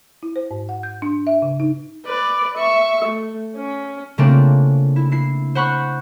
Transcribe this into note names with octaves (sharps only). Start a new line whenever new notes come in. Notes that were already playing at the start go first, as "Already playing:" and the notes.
E4
C5
G#2
F#5
G6
D4
E5
C#3
D#4
B4 D5
E5 C#6
A3
C#4
C#3 A3 A#3 C4 D4 F4
E4
E4 C7
C5 F#5 B5 C#6 F#6